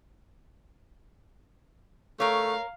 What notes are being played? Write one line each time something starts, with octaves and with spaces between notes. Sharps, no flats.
A3 A#4 C#5 F5